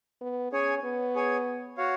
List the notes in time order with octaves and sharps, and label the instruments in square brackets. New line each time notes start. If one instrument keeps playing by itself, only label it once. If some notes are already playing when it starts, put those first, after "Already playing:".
[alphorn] B3
[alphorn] C#4 [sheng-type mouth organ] G#4 C#5 G#5
[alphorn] B3
[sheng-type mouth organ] G#4 C#5 G#5
F#4 C#5 F5